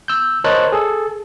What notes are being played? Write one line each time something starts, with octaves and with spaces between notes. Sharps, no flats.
E6 G6
A#4 C5 C#5 D#5 A5 F#6
G#4 A4